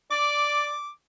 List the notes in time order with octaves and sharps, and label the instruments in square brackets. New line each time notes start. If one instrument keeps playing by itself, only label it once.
[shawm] D5 [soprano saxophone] D6